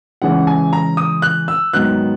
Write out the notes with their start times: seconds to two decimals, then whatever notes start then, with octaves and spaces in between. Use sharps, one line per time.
0.22 C#3 E3 G#3 C#4 E4 F#5
0.47 G#5
0.73 A#5
0.97 D#6
1.22 F#6
1.48 E6
1.73 G#2 D#3 F#3 B3 F#6